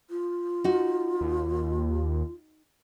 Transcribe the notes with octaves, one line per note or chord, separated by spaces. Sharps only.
F4
D#4 F#4
D#2